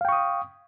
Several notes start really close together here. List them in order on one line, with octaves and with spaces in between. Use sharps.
F5 G5 C#6 D#6